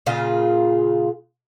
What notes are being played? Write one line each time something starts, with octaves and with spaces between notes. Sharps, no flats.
A#2 C#3 F4 G#4